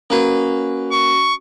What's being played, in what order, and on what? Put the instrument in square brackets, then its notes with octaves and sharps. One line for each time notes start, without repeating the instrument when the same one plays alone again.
[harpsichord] A#3 B4 [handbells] C#4 F#4
[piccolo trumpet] C#6